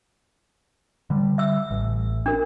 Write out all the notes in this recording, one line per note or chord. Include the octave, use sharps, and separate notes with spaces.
D3 G3
E5 E6
A1
D4 A#4